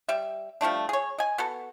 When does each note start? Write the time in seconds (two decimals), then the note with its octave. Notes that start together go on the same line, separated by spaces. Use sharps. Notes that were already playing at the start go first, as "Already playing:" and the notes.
0.09 G3 E5
0.61 F3 G3 A3 D4
0.89 G#4 C#5
1.19 D#5 G#5
1.38 B3 F#4 A4